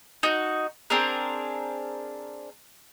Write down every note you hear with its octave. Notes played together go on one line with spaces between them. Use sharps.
D#4 F#4
C4 D4 G#4 A#4